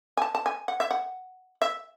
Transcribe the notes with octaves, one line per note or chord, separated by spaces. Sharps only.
G#5
A5
A5
G#5
F#5
E5
F#5
E5